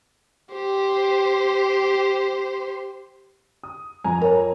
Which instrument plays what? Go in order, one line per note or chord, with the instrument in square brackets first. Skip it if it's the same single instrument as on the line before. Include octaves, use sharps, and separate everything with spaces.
[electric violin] G4 C5
[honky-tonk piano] D#6
F2 G#5 A#5
[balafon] A#4 C#5